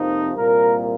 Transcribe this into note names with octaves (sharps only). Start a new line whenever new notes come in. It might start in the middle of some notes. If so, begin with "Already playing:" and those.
Already playing: F2 C3 F3 A#3 D#4
C2 A#2 A#3 A#4